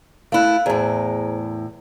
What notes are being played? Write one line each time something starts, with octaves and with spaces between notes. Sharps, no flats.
A3 E4 F5 F#6
E2 A2 G#4 C5 A#5